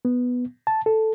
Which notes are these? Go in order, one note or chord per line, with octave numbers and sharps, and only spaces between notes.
B3
A5
A4